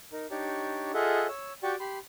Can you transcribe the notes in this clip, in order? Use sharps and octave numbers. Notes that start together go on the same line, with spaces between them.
D#4 A#4
D4 D#4 G4 C#5 D5 C#6
F4 G#4 A4 D#5 E5 F#5
C#5 E6
F#4 G4 D5 G5 C#6 D6
G4 B5 C6